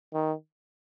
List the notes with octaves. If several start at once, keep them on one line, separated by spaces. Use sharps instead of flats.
D#3